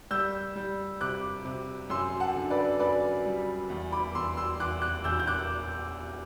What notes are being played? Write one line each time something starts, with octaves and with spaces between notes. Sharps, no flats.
G3 E6 G6
G3
C3 D6 F#6
C3
F#2 C6 E6
F#5 A5
D3
B4 D5
F#2 B4 D5
G3
E2
B5 D6
E2 C6 E6
C6 E6
E2 D6 F#6
D6 F#6
E2 E6 G6
G6
D6 F#6